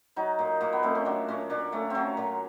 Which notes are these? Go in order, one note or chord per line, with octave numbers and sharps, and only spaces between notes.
F#3 D#4
A#2
A#2 A#3
B3
A3 C4
C#4
F#3 D4
A#2 C#4
A#2 D4
A3 C#4
F#3 C4 C#4
A#2